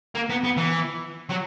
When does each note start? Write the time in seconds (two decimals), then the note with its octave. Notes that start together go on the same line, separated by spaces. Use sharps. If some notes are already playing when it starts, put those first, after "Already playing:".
0.15 A#3
0.30 B3
0.44 B3
0.57 E3
1.29 F#3